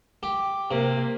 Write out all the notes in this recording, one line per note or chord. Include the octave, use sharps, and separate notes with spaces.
G4
C3 A#3